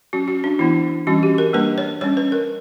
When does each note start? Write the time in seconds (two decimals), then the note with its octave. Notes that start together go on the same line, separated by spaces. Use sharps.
0.13 F#3 C#4 F#4
0.28 F#4
0.44 D4
0.59 E3 B3 D4 E4
1.07 E3 G3 C#4 F#4
1.23 G4
1.38 A#4
1.53 G3 A#3 D4 B4
1.78 C#5
2.01 G3 C#4 C#5
2.17 B4
2.32 A#4